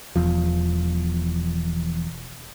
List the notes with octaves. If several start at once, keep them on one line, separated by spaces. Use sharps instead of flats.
E1 E2 F3